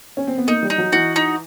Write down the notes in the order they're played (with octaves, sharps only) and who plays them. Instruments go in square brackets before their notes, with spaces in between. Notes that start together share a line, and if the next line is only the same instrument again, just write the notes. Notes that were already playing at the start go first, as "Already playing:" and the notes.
[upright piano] C#4
C4
B3
[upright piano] A#3 [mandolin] D#4
[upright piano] G3
[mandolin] D#4
[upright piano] F#3
[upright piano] E3 [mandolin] F#4
[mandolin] D#4